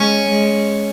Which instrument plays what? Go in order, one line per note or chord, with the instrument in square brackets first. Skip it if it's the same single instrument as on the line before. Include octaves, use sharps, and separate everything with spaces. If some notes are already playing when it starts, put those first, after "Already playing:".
Already playing: [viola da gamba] G#3 [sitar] C#4
[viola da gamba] G#3